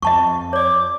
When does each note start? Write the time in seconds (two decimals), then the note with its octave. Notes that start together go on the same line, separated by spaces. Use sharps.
0.02 F2 D#5 A5 C#6
0.53 C#5 D5 D6